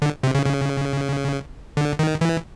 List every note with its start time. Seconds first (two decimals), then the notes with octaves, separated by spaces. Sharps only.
0.02 D3
0.23 C3
0.35 C#3
0.46 C#3
1.77 D3
1.99 D#3
2.21 E3